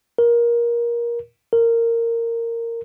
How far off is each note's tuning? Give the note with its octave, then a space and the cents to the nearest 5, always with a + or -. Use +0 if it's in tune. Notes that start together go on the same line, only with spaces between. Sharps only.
A#4 +20
A#4 -15